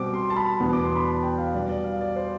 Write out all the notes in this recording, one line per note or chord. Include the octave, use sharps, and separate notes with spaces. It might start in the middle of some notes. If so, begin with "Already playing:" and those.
Already playing: B2 G3 C4 D6
C6
A5
B5
E2 B2 B3 D4
D6
C6
B5
A5
G5
F5
B2 G3 B3 D4 D5
D5
F5
D5
C5